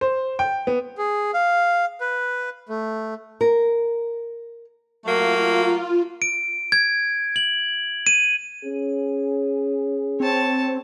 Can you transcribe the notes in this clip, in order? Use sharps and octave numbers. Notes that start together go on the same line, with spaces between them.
C5
G5
B3
G#4
F5
B4
A3
A#4
F#3 A3 A#3 F4
D7
G#6
F#7
D#7
C#4 G#4
C4 C#5 A5